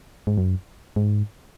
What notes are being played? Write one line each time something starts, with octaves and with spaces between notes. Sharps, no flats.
G#2
F#2
G#2